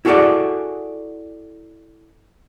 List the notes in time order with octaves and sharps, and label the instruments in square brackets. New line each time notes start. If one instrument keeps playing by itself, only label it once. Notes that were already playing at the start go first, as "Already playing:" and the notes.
[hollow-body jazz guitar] E4 F#4 G#4 A4 D5 F#5